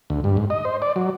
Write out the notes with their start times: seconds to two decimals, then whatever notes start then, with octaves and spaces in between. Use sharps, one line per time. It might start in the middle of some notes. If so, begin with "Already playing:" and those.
0.10 D2
0.24 G2
0.37 G#2
0.50 D#5
0.65 C5
0.82 D5
0.96 F#3